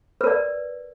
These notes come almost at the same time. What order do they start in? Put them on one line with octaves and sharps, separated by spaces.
B4 A#4 D5